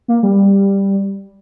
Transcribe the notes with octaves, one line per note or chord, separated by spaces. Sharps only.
A#3
G3